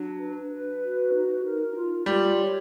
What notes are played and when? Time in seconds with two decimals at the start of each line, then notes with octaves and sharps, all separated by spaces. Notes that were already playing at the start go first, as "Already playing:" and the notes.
Already playing: F#3 D4
0.20 B4
0.51 B4
0.82 F#4
1.13 D#4
1.44 A#4
1.75 F4
2.06 G3 F4
2.37 C#5